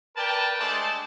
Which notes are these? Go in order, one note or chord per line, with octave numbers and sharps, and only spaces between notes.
A#4 B4 D5 G5 A5
G#3 A3 D4 C5 D5 A5